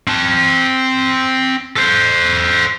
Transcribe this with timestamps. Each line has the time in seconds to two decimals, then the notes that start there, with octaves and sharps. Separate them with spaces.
0.08 C4 A5
1.76 A4 C5